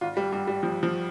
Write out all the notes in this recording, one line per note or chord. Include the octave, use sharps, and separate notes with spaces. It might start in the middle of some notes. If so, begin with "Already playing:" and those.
G#1 F4
G3
G2 G3
G3
F3
F3